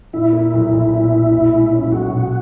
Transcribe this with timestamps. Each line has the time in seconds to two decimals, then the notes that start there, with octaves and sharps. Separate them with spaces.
0.13 A#2 E4
0.33 A#3
0.53 B1
0.72 B1
0.93 A#2
1.13 A#3
1.32 B2
1.53 G#3
1.72 C#4
1.82 E4
1.92 B1 F#4
2.12 B2